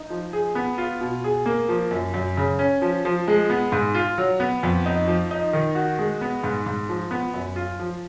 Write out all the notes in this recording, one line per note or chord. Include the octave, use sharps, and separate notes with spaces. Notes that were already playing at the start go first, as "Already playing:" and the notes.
Already playing: D#4
F3
G#4
B3
F4
B2
G#4
A#3
F3
F#2
F#2
C#3
C#4
F3
F3
G#3
B3
G#2
F4
F#3
B3
F2
D#4
F3
D#4
D#3
F#4
G#3
B3
G#2
G#2
F3
B3
F#2
F4
F3